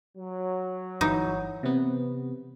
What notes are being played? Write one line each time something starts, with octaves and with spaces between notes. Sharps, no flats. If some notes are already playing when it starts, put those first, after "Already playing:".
F#3
G1 E3 D#4
C3 B3